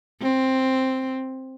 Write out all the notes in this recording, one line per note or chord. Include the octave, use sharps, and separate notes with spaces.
C4